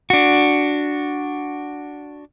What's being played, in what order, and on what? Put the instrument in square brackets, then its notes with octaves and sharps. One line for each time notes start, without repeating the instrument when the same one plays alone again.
[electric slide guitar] D4 F#4